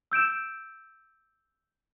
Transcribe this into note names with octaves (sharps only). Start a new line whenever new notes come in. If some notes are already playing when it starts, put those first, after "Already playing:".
E6 G6 D7 E7